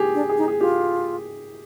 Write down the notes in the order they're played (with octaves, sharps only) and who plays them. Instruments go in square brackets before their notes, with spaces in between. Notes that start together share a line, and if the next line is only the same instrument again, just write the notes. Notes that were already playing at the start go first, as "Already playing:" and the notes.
Already playing: [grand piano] G4 G#4
[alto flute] D4
[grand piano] G#4
[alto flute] D#4
[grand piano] G#4
[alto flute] F4 [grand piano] G4